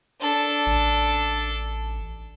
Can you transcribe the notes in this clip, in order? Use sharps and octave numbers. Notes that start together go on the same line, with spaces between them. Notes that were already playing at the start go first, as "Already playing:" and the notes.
D4 A4
A1